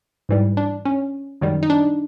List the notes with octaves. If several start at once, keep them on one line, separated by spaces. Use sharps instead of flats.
G#2 E3 G3
D4
C#4
F#2 D#3 G3
D#4
D4